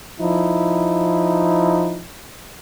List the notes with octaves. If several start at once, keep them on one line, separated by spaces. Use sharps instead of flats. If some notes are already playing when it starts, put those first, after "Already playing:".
F3 D#4 E4